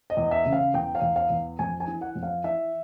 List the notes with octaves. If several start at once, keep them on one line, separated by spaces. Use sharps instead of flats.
D#5
E2
E5
C#3
F5
E2 G5
F5
E2
F5
E2
F2 G#5
G#5
E3
F#5
F2
F5
E3 E5